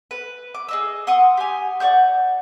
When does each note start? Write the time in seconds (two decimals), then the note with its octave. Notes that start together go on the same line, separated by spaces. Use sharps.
0.11 B4
0.55 D6
0.69 G#4 D#5 E6
1.07 F#5 C6 C#6 D#6
1.37 G4 G#5
1.80 D5 F#5 C#6 G6